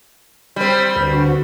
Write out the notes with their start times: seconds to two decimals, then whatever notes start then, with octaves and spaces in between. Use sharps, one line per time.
0.56 G3 C4
0.96 D2 D3 F#4 B4